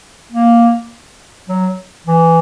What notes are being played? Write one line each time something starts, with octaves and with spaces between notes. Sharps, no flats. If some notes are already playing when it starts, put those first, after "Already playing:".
A#3
F#3
E3